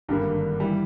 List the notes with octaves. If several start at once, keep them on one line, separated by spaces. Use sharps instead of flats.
G#1 G2 D3 G3 A#3
E3 G3